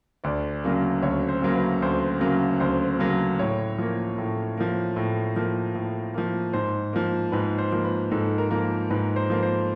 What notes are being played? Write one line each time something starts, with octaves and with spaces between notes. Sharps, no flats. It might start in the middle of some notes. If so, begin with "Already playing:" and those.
D2 D5
C#3 F#3 A#3
D2 C#5
C5
C#3 F#3 A#3
B4
D2 C5
C#3 F#3 A#3
D2 C5
C#3 F#3 A#3
A2 C#5
F3 A#3
A2
F3 A#3
A2
F3 A#3
A2
F3 A#3
G#2 C5
F3 A#3
G#2 B4
C5
F3 A#3
B4
G#2 A4
A#4
F3 A#3
G#2 B4
C5
F3 A#3
C5